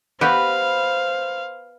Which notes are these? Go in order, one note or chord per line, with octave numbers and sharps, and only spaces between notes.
B3 F#4 G4 B4 C5 F5